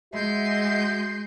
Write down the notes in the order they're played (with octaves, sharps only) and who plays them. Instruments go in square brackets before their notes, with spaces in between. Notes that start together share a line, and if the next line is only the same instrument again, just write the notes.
[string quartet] G#3 C6 G6 [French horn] F#4 [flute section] D#5 E5